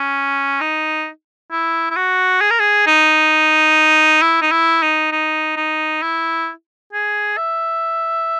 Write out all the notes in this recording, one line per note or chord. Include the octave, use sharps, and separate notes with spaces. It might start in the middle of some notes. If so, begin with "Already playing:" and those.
Already playing: C#4
D#4
E4
E4
F#4
G#4
A#4
G#4
D#4
E4
D#4
E4
D#4
D#4
D#4
E4
G#4
E5